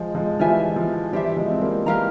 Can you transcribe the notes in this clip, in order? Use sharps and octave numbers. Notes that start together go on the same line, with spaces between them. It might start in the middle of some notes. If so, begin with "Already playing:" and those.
Already playing: F3 G#3 C5 G#5
F3 G#3
E3 G3 F4 C5 E5 G#5
F3
E3 G3 G4 C5 E5
F3 G#3
C4
G3 A#3
E3 G3 G4 A#4 F5 A#5